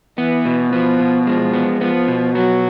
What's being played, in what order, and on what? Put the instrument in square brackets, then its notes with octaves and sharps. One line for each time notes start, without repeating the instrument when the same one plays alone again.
[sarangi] E3 [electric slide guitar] B3
[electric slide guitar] B2
[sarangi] F3 [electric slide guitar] B3
[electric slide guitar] B2
[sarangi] F3 [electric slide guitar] G#3
[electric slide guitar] B3
[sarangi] F3 [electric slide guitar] B3
[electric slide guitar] B2
[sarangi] F#3 [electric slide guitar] B3